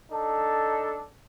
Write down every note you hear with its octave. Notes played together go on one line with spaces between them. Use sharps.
D4 D#4 A4